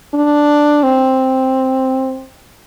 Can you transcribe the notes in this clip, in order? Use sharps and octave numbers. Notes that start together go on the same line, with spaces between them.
D4
C4